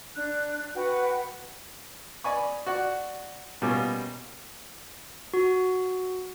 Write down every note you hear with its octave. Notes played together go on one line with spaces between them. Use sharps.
D4 F#6
F#4 B4 F#5 G5
D5 D#5 G#5 B5 C#6
F#4 D5 F#5
B2 G3 A#3 C#4 G#5 D6
F#4